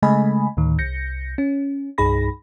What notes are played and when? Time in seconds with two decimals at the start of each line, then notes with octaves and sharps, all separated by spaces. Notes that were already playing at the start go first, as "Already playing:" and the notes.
0.02 C#3 G#3 A3 D#5 G#5 B5
0.57 D2 A2 D#3
0.78 C2 G6 A#6 C#7
1.38 C#4
1.98 C2 G2 D#4 G#4 B5 A#6